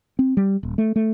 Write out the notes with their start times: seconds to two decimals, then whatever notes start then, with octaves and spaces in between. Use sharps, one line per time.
0.19 C4
0.37 G3
0.63 D#1
0.78 A3
0.96 A3